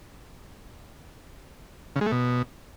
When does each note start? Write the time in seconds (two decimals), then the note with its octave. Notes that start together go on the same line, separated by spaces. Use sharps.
1.96 C#3
2.01 G#3
2.06 A3
2.12 B2